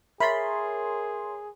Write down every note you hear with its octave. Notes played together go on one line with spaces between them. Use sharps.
G#4 A#4 C#5 E5 B5 C6 A6